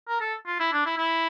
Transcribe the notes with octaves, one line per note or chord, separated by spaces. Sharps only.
A#4
A4
F4
E4
D4
E4
E4